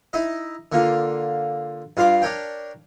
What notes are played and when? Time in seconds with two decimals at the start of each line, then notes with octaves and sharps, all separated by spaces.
0.13 D#4 E4 D#5
0.72 D3 A#3 F4
1.97 G2 F4 F5 C6 D6
2.22 D4 A#4 C#5 G5